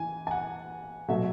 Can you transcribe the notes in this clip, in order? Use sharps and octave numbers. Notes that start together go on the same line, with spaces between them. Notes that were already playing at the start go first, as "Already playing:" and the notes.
Already playing: E3 G#5
G#5
F#5
B2 F#3 A3 E5